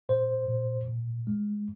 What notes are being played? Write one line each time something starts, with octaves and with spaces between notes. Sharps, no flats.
A#2 C5
A#2
A#2
G#3